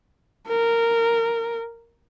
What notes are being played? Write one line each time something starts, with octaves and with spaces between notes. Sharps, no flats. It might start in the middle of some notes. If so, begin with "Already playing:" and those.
A#4